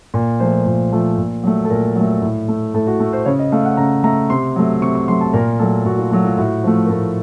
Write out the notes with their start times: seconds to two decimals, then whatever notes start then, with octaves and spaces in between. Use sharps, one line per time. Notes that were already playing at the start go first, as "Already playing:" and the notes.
0.14 A#2 A#4
0.40 F3 A3 C5
0.66 A#2
0.92 F3 A3
1.18 A#2
1.43 F#3 A3
1.65 A4
1.70 A#2 A#4
1.96 F#3 A3
2.22 A2
2.48 A3
2.74 A2 A4
2.87 F#4
3.00 A3
3.13 C5
3.25 C#3 C#5
3.39 D#5
3.52 A3 F5
3.65 F#5
3.77 C#3 A#5
4.04 A3 A#5
4.30 C3 C6
4.56 F#3 A3
4.82 C3 C#6
4.95 C#6
5.08 F#3 A3 C6
5.21 A5
5.33 A#2 A#4
5.59 F#3 A3 A4
5.85 A#2 F#4
5.99 F4
6.11 F#3 A3 F#4
6.25 F4
6.38 A2 F#4
6.63 F3 A3
6.85 A#4
6.90 A2 A4